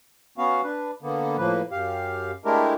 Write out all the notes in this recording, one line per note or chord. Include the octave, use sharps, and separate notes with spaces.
B3 C#4 F#4 F5
D4 B4
D3 A#3 B3
A2 F3 A#3 B4
F#2 G4 F5
G#3 A3 D4 E4 G4 A#4